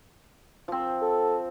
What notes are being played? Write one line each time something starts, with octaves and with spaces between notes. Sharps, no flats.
F3 C4
A4